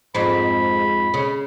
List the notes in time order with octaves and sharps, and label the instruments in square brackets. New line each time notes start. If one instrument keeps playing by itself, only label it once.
[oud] F2 G#2 C4 [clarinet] B5
[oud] C#3